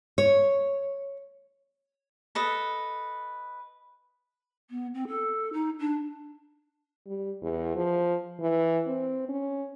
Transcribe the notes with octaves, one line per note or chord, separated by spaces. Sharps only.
C#5
A4 B4 D#5
B3
C4
A4
D#4
D4
G3
E2
F3
E3
C4
C#4